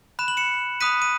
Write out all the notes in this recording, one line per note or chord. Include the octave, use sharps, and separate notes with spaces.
B5 F#6 E7
F#7
C#7 E7
B5 D#6 F#6 B6 D#7
D#7